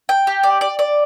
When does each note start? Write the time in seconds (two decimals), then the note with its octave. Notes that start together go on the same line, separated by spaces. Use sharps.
0.09 G5
0.27 G4
0.43 D5
0.61 D5
0.79 D5